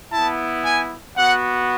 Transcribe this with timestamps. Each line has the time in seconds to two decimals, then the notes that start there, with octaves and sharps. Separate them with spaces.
0.12 B3 E4 A5
0.65 G#5
1.17 B3 F#4 F#5